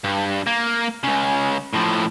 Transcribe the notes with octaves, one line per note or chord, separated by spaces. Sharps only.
G2
A#3
C#2 C#3
A2 F3